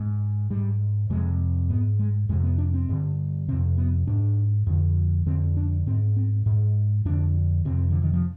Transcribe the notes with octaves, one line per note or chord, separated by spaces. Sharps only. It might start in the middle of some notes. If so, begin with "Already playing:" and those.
Already playing: G#2
G#2 G3
F2 C3 G#3
G#2 B3
G#3
F2 C3 G#3
B3
D4
C4
G2 D3
F2 C3 C4
B3
G#2 D4
F2 D3
F2 D3 C4
D4
G#2 C4
C4
G#2
F2 D3 D4
F2 C3 C4
D3
D#3
F3